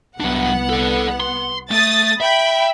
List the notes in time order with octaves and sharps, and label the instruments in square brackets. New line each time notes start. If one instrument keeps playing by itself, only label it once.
[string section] C2 B3 F#5 [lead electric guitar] F#3 D4
[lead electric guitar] A4 D5
C6
[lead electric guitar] A3 [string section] D#6 A6
[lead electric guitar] E5 [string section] G5 B5